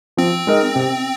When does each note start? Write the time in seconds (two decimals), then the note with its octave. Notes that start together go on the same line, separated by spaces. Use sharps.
0.17 F3 C4
0.47 G#3 D#4 A#4 D#5
0.76 C3